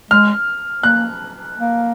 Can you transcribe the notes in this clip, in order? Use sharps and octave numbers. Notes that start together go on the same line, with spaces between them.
G#3 F6
A#3 F#6
A#3